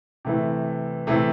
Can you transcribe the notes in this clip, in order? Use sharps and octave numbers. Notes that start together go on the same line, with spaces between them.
C3 E3 A3
C3 E3 A3